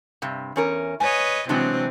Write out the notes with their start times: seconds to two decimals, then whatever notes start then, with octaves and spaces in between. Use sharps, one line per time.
0.22 G2 C3
0.56 E2 C#4 A#4
1.00 B4 C#5 D#5 G#5
1.49 C3 E3 F#3 G#3 C4 D4